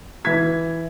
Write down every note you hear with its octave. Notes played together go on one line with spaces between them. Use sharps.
E3 G#6 B6